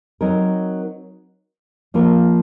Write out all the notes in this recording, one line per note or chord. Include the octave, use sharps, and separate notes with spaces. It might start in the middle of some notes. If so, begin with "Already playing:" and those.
F#3 C4 D#4 A#4
F3 A#3 F4 A#4